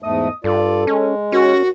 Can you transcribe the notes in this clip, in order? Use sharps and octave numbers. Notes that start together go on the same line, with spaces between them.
E2 G#2 A3 D#5 D#6
G2 F4 A4 D5
G#3 C#4
D#2 C#4 F#4